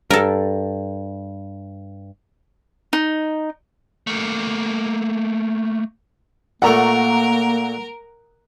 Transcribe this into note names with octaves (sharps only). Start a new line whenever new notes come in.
G2 A4 A#4
D#4
A3 A#3
A#2 A3 A#3 A#4 F#5 A#5 C#6